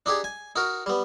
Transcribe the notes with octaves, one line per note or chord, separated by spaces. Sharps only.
D4 D#4 G4 G#4
G#5
D#4 F#4 A#4
G3 B3